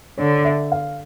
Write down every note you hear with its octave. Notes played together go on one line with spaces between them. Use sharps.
D3 C#5
E5
F5